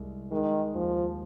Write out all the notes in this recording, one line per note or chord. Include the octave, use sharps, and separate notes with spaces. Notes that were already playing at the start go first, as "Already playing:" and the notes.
Already playing: C2 G#3
D#3 G#3
D#2 F3